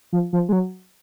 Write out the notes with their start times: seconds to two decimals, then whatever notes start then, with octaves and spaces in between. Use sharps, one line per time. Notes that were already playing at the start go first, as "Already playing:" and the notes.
0.13 F3
0.33 F3
0.49 G#3
0.53 F#3